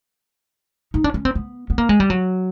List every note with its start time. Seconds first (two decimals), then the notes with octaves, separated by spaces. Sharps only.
0.94 D#4
1.04 D4
1.14 C#4
1.25 C4
1.35 B3
1.70 B3
1.78 A#3
1.89 G#3
2.00 G3
2.10 F#3